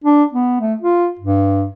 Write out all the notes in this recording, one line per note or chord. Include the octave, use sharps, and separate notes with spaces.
D4
B3
A3
F4
G2